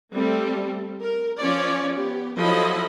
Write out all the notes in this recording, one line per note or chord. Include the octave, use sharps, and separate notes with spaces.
G3 A3 C4 A4
A#4
F3 C#4 C#5 D5
B3 G4
F3 F#3 E4 A4 D#5 B5